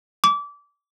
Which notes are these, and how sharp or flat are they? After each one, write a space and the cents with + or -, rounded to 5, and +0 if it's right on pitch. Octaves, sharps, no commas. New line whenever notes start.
D6 -25